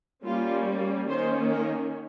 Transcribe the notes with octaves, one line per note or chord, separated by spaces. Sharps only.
G3 A#3 C#4 F4
D#3 A#3 C#4 C5
A#4